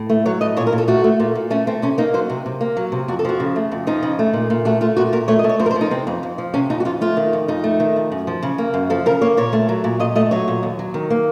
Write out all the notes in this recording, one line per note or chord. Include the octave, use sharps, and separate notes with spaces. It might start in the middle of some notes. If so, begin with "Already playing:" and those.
Already playing: A2
A3
F#3 C#5
A2 D#5
A#2 C#5
A#4
A#2
A4
A3 F#4
A3
A#2
A#2
A3 C#4
A3 C4
C3 C#4
A#3 D#4
F#3 C5
C3
C3
A#3
F#3
C3
F2 F#4
A4
F3 F#4
C#3
A3
F2
F3 D#4
C#3
A3
A#2
A#2
A3 F#4
A3 F4
A#2 F#4
A#2 A#4
A3 C#5
D#5
A3
C#5
F2 C5
A#4
C5
F3
D#4
C3 C4
F2
F2
F3
C3 C#4
F2 D#4
F#4
F2 F4
A3 F4
D#3
F2
F2 D#4
A3
D#3
F2
F#2
F3
C#3
A#3
F#2
F3 A4
C#3 A#4
A#3 C#5
A#2 C#5
A3
F#3
A#2
A#2 D#5
A3 D#5
F#3 C#5
A#2
D#2
F#3
D#3
A#3